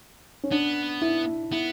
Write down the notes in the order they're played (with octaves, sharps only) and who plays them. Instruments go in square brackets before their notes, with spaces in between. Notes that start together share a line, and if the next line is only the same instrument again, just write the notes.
[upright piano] C#4
[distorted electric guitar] B3 [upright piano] D4
[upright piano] E4
[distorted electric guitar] B3 [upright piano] E4